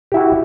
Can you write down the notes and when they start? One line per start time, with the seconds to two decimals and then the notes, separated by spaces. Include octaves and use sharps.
0.12 G4
0.14 E4
0.17 F#4